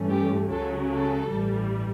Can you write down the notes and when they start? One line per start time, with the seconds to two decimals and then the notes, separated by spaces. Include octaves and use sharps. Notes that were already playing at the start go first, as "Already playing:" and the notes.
Already playing: G2 E3 A3 C#4
0.09 G4
0.48 C#2 C#3 F#3 C#4 A4
0.88 A4
1.28 A1 G2 E3 G3